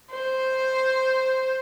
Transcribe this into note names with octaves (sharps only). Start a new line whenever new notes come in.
C5